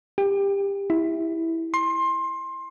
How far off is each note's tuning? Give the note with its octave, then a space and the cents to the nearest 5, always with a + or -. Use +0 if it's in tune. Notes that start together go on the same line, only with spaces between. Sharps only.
G4 +20
E4 -10
C6 +20